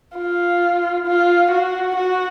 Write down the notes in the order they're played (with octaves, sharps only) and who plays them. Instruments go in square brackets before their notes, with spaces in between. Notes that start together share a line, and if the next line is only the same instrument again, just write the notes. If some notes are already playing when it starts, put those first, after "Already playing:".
[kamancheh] F4
F4
F#4
F#4